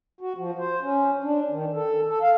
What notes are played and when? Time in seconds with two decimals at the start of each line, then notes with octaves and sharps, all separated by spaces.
0.21 F#4
0.38 F3
0.59 C5
0.82 C#4
1.23 D4
1.51 D#3
1.74 A4
2.08 A4
2.22 F5